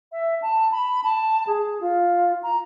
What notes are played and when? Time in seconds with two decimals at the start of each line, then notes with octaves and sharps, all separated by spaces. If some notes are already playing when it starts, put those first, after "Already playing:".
0.12 E5
0.42 A5
0.72 B5
1.04 A5
1.47 G#4
1.81 F4
2.43 A#5